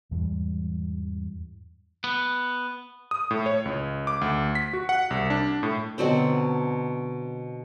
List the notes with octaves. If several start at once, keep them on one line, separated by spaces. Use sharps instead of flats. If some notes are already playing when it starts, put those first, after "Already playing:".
E2 G#2 E3 G3
B3
D#6
A2
C#5
C#2
D6
D2
B6
F#4
F#5
C2
D4
A2
B2 D3 F#3 C4